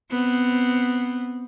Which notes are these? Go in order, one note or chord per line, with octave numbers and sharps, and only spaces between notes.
B3 C4